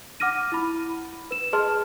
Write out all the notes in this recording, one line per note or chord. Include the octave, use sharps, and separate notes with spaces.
F#5 D6 F6 A#6 D#7
E4 B5
B4 E7
G#4 B4 D#5 A5 C6 F6